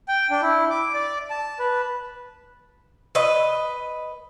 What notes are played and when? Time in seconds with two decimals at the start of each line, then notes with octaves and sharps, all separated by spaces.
0.08 G5
0.30 D4
0.42 E4
0.70 D6
0.94 D5
1.30 A5
1.59 B4
3.15 B4 D#5